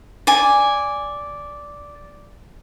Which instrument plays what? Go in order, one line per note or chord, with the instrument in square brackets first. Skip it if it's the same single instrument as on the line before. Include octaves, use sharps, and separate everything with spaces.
[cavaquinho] D5 G#5